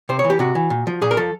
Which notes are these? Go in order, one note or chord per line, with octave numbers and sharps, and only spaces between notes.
C3 C5
C#5
E3
G4
C3 F#4
E3
A#2
F3
A#2 G#4
A#4
F3 A4